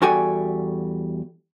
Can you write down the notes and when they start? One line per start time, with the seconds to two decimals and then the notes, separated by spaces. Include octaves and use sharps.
0.02 E2 G3 F#4 A4 G5 G#5